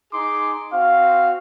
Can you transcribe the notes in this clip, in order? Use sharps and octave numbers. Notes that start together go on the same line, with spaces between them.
D#4 G#4 C6 D6
C4 F#4 F5